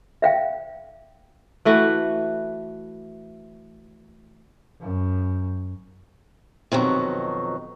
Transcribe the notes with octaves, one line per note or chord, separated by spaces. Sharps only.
E5 F5 G5
E3 A3 F#4 B4
F#2
F2 B2 D#3 F#3